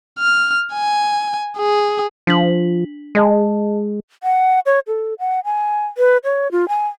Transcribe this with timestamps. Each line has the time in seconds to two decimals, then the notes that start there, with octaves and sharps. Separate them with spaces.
0.19 F6
0.73 G#5
1.57 G#4
2.27 F3 D4 B6 F#7
3.15 G#3 G#4 D#5 A5
4.23 F#5
4.66 C#5
4.87 A4
5.19 F#5
5.45 G#5
5.98 B4
6.24 C#5
6.52 F4
6.68 G#5